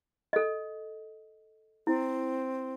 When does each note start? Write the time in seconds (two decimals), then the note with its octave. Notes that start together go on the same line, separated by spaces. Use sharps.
0.33 A4 D#5
1.87 C4 E4